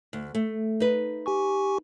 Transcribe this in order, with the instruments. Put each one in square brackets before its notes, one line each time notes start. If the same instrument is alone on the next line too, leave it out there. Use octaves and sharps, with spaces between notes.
[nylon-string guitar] D2
A3
D#4 B4
[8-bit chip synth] G4 G#5 C#6